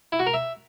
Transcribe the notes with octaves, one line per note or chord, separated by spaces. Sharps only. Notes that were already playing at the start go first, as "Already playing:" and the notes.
E4
F#4
A#4
E5